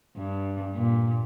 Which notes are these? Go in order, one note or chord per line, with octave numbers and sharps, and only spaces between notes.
G2
A#2